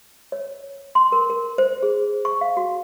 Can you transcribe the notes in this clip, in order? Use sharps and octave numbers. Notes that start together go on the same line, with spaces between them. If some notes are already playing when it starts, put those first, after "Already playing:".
C#5
C6
A#4
A#4
C5
G#4
C#6
F5
F#4